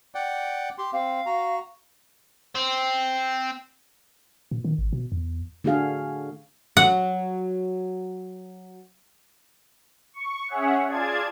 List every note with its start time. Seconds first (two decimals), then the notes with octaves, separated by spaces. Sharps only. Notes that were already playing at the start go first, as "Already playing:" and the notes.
0.15 D5 F#5 G5
0.78 G4 C6
0.93 C4 F5
1.26 F#4 A#5
2.55 C4
4.51 A#2
4.64 D#3
4.78 G#1
4.93 B2
5.12 E2
5.64 D3 A3 D4 F#4 G#4 F5
6.77 F#3 F#5
10.14 C#6
10.48 C#4 G#4 C#5 E5 F#5
10.87 F4 G#4 D5 A5 G#6